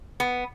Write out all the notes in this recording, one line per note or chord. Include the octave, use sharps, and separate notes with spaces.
B3